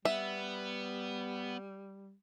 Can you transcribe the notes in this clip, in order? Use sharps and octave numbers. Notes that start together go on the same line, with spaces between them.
G3 B3 E5